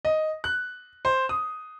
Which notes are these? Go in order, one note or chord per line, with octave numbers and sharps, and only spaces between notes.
D#5
F#6
C5
D#6